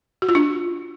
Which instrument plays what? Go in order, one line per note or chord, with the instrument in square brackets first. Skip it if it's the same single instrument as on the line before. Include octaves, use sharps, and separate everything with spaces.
[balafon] F#4
F4
D4